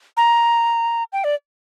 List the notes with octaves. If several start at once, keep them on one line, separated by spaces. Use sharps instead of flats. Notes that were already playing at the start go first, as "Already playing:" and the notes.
A#5
G5
D5